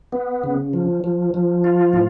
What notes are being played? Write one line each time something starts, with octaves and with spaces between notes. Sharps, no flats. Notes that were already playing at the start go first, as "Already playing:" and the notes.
B3
C#3
F3
F3
F3
F4
A2